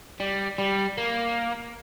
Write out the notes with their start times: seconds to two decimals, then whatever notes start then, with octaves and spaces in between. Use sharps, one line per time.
0.20 G3
0.58 G3
0.97 A#3